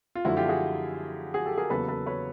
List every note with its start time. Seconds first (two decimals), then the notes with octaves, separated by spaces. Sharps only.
0.15 F4
0.25 F#2 D3 F3 A3 E4 F#4
0.37 F4 G4
0.49 F#4 G#4
1.34 F#4 G#4
1.46 G4 A4
1.58 G#4 A#4
1.70 E2 C#3 F#3 A#3 A4 B4
1.88 A4 B4
2.06 B4 C#5